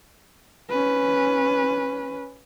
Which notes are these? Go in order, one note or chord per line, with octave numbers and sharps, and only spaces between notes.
C#4 B4